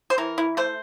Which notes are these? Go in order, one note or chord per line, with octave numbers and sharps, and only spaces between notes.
C5
E3 A#4
E4
A3 C5